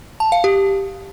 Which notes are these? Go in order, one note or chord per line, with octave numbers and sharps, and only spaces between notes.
A5
F5
G4